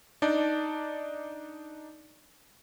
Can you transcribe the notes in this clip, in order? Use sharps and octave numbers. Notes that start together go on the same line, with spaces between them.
D4 D#4 D5 A5